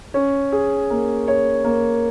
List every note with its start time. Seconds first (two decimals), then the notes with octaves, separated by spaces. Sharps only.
0.14 C#4
0.52 G#4
0.90 A#3
1.28 C#5
1.64 A#3